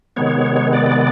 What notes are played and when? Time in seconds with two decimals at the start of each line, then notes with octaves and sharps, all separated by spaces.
0.16 C3 D#3 G#3 B3 C#5
0.73 D5